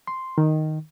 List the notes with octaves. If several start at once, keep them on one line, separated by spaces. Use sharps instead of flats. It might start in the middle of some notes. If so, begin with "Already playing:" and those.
C6
D#3